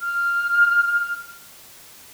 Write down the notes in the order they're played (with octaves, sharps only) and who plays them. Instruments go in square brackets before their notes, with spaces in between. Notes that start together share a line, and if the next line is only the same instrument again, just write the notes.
[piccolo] F6